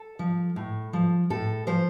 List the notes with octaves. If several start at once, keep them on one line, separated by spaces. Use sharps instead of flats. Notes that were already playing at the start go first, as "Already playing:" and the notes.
Already playing: A4
F3
A2
F3
A2 A4
F3 C5